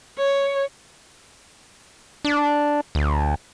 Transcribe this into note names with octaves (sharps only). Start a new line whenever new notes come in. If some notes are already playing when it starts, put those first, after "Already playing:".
C#5
D4
D2